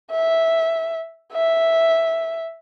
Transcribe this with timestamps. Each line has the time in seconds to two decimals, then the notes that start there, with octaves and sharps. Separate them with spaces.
0.11 E5
1.33 E5